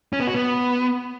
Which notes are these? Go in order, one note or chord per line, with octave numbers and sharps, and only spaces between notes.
C#4
B3
F#4
B3